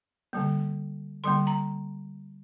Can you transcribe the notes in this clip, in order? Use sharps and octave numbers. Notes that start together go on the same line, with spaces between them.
D3 G3 A#3
D3 G3 A#3 C6
A#5